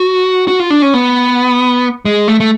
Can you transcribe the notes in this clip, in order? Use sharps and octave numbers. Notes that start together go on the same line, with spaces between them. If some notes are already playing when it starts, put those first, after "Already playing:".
Already playing: F#4
F#4
F4
D4
C#4
B3
G#3
A3
A3